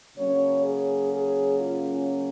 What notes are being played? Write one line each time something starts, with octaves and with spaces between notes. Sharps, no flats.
C#3 F#3 A#3 C#4 C#5
G#4
G#4
F4